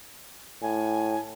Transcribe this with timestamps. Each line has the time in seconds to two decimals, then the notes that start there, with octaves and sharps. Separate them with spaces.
0.62 A2 G#5